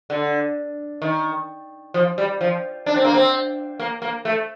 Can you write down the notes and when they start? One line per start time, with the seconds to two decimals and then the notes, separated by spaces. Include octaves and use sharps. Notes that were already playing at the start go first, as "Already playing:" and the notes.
0.10 D3
1.02 D#3
1.94 F3
2.18 G3
2.41 F3
2.86 D4
2.96 C4
3.05 A#3
3.14 C4
3.79 A#3
4.02 A#3
4.25 A3